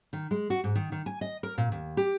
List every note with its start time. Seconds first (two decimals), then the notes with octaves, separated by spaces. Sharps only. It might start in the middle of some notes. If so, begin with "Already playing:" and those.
0.13 D#3
0.31 G#3
0.50 F#4
0.64 G#2
0.75 D#3
0.92 D#3
1.06 G#5
1.21 D#5
1.43 A#4
1.58 A#2
1.72 D#2
1.97 G4